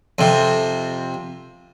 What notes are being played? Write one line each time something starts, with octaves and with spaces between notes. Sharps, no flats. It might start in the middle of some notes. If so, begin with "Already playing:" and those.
F2 C3